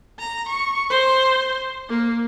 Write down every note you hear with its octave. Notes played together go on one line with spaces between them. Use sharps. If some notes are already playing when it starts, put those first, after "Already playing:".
A#5
C#6
C5
A#3